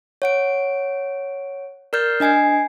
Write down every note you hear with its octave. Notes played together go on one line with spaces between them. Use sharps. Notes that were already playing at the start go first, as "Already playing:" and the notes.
C#5 F#5 D7
A#4 D5 F6 G6 A6 C7
D4 D#5 G#5 G#6 C7